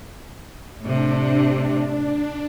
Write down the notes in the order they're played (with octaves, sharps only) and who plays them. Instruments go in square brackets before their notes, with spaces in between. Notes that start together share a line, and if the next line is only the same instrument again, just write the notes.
[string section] A2 C3 [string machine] D4